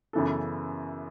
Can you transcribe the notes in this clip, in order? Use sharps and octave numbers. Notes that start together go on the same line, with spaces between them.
F#2 C#3 E3 B3 A4